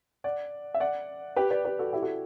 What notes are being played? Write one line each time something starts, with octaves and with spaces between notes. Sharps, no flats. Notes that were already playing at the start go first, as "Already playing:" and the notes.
D5 F#5
E5
D5 F#5
G4 B4
B4 D5
G4 B4
F#4 A4
E4 G4
F#4 A4